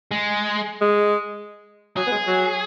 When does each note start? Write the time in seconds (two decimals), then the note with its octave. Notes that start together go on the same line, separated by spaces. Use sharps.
0.11 G#3
0.81 G#3
1.97 F#3 G#4
2.07 B3
2.12 G#3
2.27 F#3